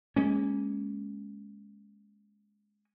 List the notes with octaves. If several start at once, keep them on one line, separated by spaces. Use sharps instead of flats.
G#3 A#3 C#4